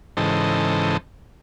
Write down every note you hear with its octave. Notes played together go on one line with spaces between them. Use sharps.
G#2 C#3 E3 A4 C5 D#5